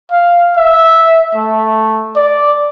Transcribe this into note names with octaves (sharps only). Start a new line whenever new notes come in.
F5
E5
A3
D5